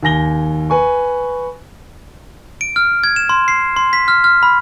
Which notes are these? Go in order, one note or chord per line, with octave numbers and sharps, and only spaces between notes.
D#2 G#5 A#6 G7
B4 G#5 C#6
D7
F6
G#6
E7
C6
C7
C6
B6
F6
F6
B5